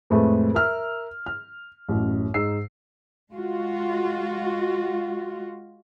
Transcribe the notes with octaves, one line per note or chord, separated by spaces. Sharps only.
F2 A2 G#3 A3 B4
A#4 E5 E6 F6
F6
A1 F#2
G#2 D#4 E6 C7
G#3 F4 F#4